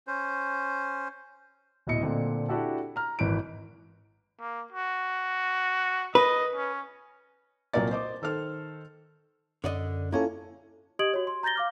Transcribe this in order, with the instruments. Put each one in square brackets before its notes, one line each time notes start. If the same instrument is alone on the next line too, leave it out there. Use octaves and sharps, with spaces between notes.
[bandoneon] C#4 C5
[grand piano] D1 B2 E4 D#5 C#7
A#2 D3 C4 D4
D4 E4 F#4 G4 A4
A#5 F6
G#1 E3 B4 D7
[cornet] A#3
F#4
[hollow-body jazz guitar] B4 [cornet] D#5
[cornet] C#4
[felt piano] C2 A#2 F#3 A#3 D5 A6
C5 D#5 D6
D#3 A4 C5 F6
[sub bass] F#2 [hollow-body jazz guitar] D3 D5 D#5
[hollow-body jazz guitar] A#3 C#4 [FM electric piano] E4 F4 A4
[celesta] G4 D#5 D#6 G#6 D7 F#7
F#4 C#5
C6
A#5 G6 A6 A#6 G7
F5 D6 F6